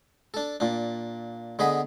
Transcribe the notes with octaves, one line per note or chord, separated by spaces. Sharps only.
D4 A4
A#2 D4
D3 B3 G#4 D#5 B5